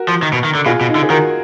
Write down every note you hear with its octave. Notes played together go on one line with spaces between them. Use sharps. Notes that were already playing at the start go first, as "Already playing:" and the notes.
Already playing: F#4 A#4
F3
D#3
B2
D#3
D3
B2 F4 G#4
B2
D#4
D3
G#4
D#3 F#4 A#4